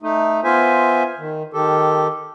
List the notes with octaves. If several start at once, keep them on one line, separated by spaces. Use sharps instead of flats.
A3 D#4
B3 F4 C5 E5 G#5
D#3
D#3 G4 A4